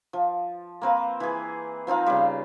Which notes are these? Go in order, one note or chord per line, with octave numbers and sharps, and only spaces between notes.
F3
A#3 C4 B4
E3 G#4
F3 C4 D#4 F4
C#3 G3